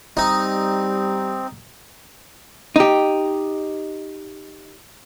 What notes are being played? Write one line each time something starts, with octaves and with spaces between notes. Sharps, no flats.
G3 C4 D#4
D#4 G4